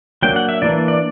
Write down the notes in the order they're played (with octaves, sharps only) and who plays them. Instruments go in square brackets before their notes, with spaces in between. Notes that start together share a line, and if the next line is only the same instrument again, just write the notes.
[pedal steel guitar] F#3 A#3 D4 G5
F#5
E5
E3 A#3 D4 D5
D5